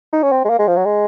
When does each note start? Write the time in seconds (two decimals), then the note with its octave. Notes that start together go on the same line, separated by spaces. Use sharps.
0.12 D#4
0.23 C#4
0.32 C4
0.45 G#3
0.50 A#3
0.59 G#3
0.68 F3
0.77 F#3
0.85 G#3